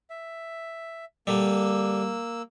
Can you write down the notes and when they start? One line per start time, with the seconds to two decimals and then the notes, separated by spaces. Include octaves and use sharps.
0.10 E5
1.27 D3 G3 A#3 E6